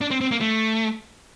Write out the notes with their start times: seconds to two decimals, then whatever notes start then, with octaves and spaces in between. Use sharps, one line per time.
0.01 D4
0.11 C4
0.21 C4
0.31 A#3
0.41 A3